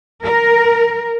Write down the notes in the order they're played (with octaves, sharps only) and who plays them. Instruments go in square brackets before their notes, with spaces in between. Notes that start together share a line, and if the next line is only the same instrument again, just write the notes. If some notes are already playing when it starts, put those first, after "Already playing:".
[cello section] A#4